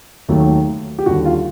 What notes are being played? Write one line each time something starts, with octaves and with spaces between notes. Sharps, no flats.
D#2 D#3 F#3 A3
G4
D#2 D3 G3 F#4
F4